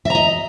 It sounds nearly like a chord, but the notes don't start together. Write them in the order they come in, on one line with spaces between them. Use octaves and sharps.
E5 A#5 D#5